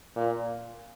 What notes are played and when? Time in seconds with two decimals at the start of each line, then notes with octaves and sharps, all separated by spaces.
0.16 A#2